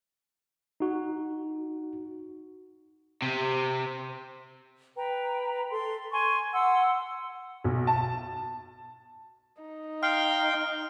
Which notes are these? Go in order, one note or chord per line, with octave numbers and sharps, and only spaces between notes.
D#4 F#4
C3
B4 G5 A#5
A4 C6
G#5 C6 C#6
F#5 C6 E6
B1
A5
D#4
F5 G5 C6 F6